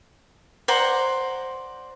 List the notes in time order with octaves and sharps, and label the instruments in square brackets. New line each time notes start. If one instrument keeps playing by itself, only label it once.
[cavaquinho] C5 D5 F#5 A#5